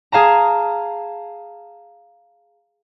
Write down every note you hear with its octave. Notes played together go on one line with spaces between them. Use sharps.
G#4 F5 A5 A#5